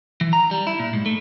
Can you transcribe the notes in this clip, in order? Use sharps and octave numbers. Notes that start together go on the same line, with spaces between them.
E3
A#5
G3
E4
A#2
G#2
A3